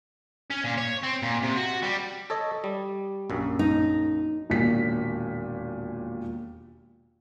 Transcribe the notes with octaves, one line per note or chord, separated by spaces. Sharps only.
C#4
A#2
C#5
C4
A#2
C3
F#4
G3
A4 C#5 D#5
G3
A#1 F#2
D#4
E1 D#2 A#2 B6